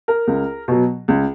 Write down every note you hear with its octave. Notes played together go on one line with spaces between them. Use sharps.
A#4
C#2
B2 F#3
C#2